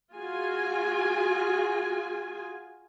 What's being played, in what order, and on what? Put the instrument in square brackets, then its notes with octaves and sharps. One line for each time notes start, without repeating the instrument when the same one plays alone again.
[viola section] F4 F#4 G#4 G#5